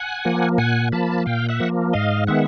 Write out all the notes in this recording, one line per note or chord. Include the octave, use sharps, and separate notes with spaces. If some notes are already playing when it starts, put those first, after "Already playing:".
Already playing: F#5 G#5
F3 A#3
A#2 F#5 G#5
F3 A#3 A5 B5
A#2 F5 G5
E5 F#5
F3 A#3
G#2 D#5 F5
D#3 G#3 B3 E5 F#5